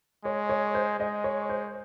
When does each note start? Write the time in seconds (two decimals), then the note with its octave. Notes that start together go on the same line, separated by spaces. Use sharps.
0.24 G#3 C#5
0.49 C#5
0.75 C5
0.99 G#3 D#5
1.24 C#5
1.49 C5